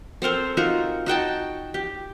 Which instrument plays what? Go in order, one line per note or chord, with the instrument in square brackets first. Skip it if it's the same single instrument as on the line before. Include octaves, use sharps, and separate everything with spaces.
[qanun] C4 A4 A#4 C5
D#4 F4 F#4 A#4
D#4 F#4 G5 A5
G4